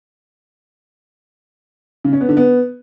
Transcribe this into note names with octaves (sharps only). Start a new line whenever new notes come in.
C#3
C#4
B3
D3
B3